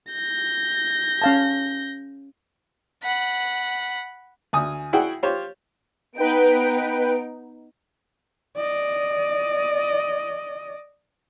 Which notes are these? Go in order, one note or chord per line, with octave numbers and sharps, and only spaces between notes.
G6 A#6
C#4 F5 A5
F#5 B5
D2 G#5 D#6
E4 F#4 G#4 F#5 G5
F4 G4 C5 C#5
B3 D#4 B4 G5 D7
D5 D#5